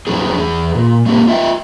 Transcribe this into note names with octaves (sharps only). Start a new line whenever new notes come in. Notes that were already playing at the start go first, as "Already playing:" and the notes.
A2 F3 F#3 C#4 D#4 G#4
E2 G#4
A#2
G#3 A#3 C#4 G4
F4 D#5 E5 F#5 G5